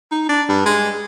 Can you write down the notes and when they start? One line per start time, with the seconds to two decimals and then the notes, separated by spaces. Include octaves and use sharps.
0.11 D#4
0.29 D4
0.49 G2
0.66 G#3